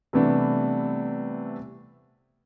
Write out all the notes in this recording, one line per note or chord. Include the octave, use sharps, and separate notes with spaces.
C3 E3 G3 A3 B3 D4